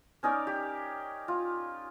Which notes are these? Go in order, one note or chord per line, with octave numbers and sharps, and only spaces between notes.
C#4 D#4 A#4 D5
G4
F4